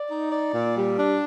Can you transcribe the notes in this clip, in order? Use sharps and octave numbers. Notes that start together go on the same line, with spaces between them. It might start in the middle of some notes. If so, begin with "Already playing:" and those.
Already playing: D5
D#4
D5
A#2
G3
D4